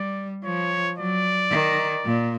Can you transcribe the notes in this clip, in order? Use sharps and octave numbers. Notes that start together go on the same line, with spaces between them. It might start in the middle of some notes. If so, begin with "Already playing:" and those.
Already playing: G3 D5
F3 C#5
F#3 D5
D#3
A#2